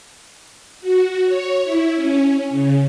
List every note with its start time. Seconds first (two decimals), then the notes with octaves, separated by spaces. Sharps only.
0.81 F#4
1.25 C#5
1.63 E4
1.95 C#4
2.50 C#3